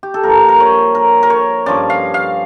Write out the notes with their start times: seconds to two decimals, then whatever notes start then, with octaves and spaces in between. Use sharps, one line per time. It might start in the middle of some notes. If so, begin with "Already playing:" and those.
0.03 G4
0.14 A4
0.23 G2 F3 A#3 A#4
0.49 A#4
0.60 C#5
0.95 A#4
1.23 A#4
1.30 C#5
1.66 G2 F3 C#4 D5
1.90 F5
2.14 F5